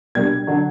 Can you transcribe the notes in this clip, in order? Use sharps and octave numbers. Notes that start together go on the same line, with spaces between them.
B2 G3 A#3 D4 G#6
D3 F#3